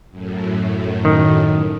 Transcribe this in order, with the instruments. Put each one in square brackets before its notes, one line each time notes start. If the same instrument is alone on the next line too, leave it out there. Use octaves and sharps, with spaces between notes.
[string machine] F#2 A2
[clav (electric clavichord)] D#3